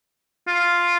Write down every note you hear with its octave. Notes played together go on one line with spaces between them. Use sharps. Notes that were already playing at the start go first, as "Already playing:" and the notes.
F4